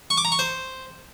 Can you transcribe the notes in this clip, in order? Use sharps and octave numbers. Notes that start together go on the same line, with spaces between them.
C#6
D6
A#5
C#6
C5